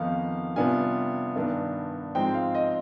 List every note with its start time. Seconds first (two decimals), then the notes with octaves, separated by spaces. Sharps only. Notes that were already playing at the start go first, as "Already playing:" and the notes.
Already playing: F2 D#3 B3 D#4 F5
0.56 C3 G3 B3 D4 F4 G#5
1.36 G2 D#3 B3 D4
2.15 G#2 F3 G#3 C4 G5
2.34 F5
2.55 D#5